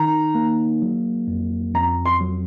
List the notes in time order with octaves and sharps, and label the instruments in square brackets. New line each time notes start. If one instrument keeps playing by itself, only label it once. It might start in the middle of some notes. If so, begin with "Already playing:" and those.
Already playing: [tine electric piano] D#3 D#4 [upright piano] A#5
[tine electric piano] A#3
F#3
F2
[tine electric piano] F2 [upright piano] A#5
[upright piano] C6
[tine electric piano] F#3